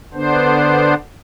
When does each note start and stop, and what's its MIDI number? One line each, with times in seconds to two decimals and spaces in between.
0.14 0.94 50
0.14 0.94 59
0.14 0.94 62
0.14 0.94 72